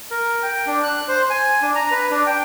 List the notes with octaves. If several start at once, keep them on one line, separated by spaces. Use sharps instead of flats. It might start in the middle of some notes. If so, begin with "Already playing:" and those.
A#4
G5
D4
F#6
C5
G#5
D4
A#5
B4
D4
G5